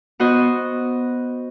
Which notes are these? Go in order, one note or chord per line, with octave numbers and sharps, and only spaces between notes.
B3 F#4 C5 D#5